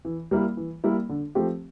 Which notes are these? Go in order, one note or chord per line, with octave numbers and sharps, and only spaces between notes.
E3
G3 A#3 E4
E3
G3 A#3 E4
D3
F3 A3 C4 G4